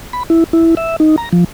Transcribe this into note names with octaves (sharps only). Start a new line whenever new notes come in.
B5
E4
E4
E5
D#4
A#5
F3